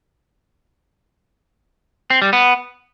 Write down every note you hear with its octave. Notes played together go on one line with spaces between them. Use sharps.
C4
G3
B3